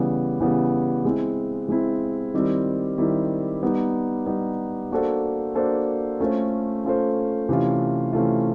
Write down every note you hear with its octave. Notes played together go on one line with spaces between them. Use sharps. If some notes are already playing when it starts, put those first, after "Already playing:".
Already playing: C#3 E3 G3 B3
C#3 E3 G3 B3
G#3 C4 E4
G#3 C4 E4
D#3 G3 C4 E4
D#3 G3 C4 E4
G3 B3 D#4
G3 B3 D#4
A#3 D4 F#4 A4 C5
A#3 D4 F#4 A4 C5
A3 C#4 F4 A4 C5
A3 C#4 F4 A4 C5
C3 E3 A3 C#4 F4
C3 E3 A3 C#4 F4